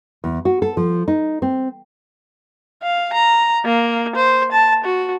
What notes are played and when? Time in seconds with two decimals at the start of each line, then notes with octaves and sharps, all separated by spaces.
0.24 E2
0.45 F#4
0.62 A4
0.77 F3
1.08 D#4
1.42 C4
2.83 F5
3.14 A#5
3.65 A#3
4.16 C5
4.52 A5
4.84 F#4